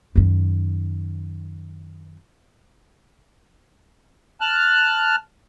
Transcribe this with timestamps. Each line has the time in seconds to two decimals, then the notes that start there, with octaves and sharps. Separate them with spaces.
0.16 F#2 D#3
4.41 A5 F6 F#6